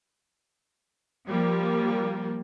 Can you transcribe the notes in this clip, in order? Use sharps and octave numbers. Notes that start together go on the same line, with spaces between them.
F3 G3 A#3